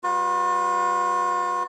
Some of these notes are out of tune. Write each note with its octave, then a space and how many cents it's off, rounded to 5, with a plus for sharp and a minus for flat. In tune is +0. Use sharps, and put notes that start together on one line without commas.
G3 -5 F4 +45 B4 +0